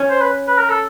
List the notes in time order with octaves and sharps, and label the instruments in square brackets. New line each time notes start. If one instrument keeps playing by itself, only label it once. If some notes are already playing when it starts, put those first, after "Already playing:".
Already playing: [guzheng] C#4
[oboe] C5
B4
B4
A#4
A4